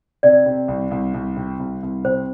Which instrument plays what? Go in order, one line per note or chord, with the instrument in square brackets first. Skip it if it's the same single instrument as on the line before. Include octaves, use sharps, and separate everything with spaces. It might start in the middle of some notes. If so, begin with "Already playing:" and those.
[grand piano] C3 [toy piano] D5
[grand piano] C3
C2
C2
C2
C3
C2
C2
[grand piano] C3 [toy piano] C5